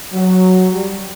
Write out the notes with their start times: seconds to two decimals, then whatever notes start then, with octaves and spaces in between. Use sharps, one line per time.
0.13 F#3
0.72 G3